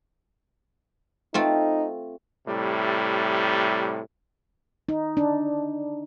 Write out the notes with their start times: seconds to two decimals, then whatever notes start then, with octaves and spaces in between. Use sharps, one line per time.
1.34 A3 C4 D#4 F4
2.47 A2 C3 G3
4.89 D#4
5.17 D4